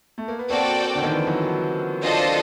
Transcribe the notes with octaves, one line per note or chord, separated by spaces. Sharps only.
A3
A#3
B3
A#3 C4 F#4 A4 D5 G5
D3
D#3
E3
F3
E3 F#3
D4 F4 A4 C5 D#5